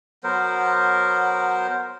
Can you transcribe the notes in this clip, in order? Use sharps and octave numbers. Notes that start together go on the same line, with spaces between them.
F#3 B3 A#4 C5